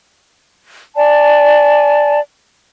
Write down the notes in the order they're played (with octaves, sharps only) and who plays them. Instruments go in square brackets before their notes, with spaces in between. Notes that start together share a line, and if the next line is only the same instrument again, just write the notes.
[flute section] D5 G#5 A5